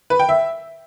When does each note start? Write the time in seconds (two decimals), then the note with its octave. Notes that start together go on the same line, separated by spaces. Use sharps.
0.10 B4
0.19 G5
0.29 E5